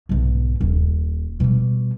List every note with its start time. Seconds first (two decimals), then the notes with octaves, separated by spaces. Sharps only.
0.09 B1 G#2
0.61 D#1
1.40 B2 G3